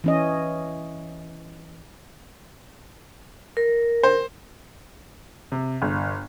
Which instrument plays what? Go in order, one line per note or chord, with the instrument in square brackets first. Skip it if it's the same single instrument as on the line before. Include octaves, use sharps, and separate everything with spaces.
[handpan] E3 C#4 D#5
[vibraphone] A#4
[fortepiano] C5
[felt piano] C3
G1